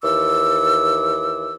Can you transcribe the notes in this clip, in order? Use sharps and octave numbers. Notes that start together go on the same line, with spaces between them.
D#2 E3 D6 E6